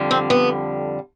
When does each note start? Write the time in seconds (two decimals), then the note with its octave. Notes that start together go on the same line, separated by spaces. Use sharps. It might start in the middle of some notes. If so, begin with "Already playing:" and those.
Already playing: F2 D3 G3
0.11 C4
0.30 B3